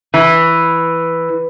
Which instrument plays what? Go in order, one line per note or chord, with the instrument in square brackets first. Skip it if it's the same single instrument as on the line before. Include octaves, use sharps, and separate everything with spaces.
[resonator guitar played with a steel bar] E3